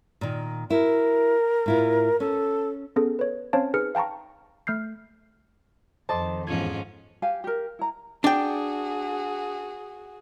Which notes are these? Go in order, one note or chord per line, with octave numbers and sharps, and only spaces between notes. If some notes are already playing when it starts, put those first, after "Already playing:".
A#2 D#3
E4 F#4 A#4
A2 E4 F4
C#4 A4
B3 C#4 G#4 A4
B4 C#5
C4 C#4 C5 C#5 F5 A5
D#4 G#4 B4 F6 C#7
F5 G5 A5 A#5 C#6
A3 F6 G6 C7
F2 D#3 A4 C5 D#5 A5 C6 D6
E2 G#2 F3 C#4 G#6
G4 F5 G#5
G4 A#4
E4 A#5
D4 F#4 G#4 G5